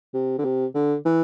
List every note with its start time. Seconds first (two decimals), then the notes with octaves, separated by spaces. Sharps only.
0.14 C3
0.39 D3
0.45 C3
0.75 D3
1.05 E3